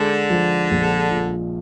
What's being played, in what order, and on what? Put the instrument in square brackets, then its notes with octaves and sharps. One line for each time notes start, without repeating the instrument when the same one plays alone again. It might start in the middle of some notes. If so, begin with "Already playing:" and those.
Already playing: [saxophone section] D3 [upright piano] G#3
[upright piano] F3
A#1
A#2